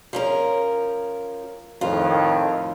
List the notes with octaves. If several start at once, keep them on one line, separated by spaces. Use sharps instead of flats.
F3 C#4 A#4
F2 A2 D#3 F4